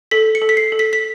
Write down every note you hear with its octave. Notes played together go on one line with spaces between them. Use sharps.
A4 B6
C#7
A4
B6
C7
A4
B6
B6